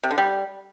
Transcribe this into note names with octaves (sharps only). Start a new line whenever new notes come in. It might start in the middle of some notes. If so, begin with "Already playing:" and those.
C3
D3
G3